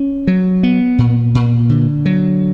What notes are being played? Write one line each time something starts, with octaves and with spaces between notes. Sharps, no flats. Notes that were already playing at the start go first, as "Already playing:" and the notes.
Already playing: C#4
F#3
B3
A#2
A#2
D3
F#3